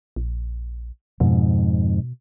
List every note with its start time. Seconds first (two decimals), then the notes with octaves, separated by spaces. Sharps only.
0.16 A#1
1.20 F2 G#2 B2